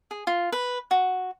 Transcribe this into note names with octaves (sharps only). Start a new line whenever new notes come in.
G#4
F4
B4
F#4